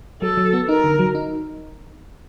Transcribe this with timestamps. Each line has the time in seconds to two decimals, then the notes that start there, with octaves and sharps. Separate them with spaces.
0.22 F#3 A4
0.37 F#3
0.53 B3
0.69 D#4 A#4
0.84 D3
0.99 F#3
1.15 D#4